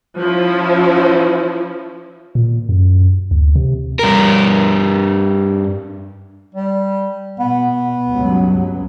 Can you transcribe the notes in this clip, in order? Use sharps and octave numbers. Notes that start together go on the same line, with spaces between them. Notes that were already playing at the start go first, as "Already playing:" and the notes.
F3 C#4 E4
A#2
F#2
D2
C3
G2 A#4
G3
B2 B3
C#2 G2 F#3